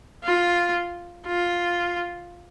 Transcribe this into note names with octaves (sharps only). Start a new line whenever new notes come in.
F4
F4